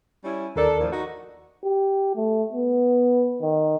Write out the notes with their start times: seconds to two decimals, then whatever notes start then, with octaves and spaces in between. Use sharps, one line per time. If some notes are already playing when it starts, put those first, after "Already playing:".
0.23 G3 C#4 E4
0.56 D#2 D4 A4 A#4 D5
0.80 A2 F3
0.91 D#4 F#4
1.64 G4
2.16 A3
2.53 B3
3.42 D#3